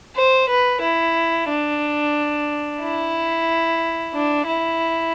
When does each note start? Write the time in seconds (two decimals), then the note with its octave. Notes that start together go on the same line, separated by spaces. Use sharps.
0.16 C5
0.50 B4
0.82 E4
1.49 D4
2.82 E4
4.14 D4
4.47 E4